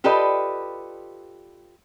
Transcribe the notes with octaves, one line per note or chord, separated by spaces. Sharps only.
F4 G4 A4 B4 D5 D#5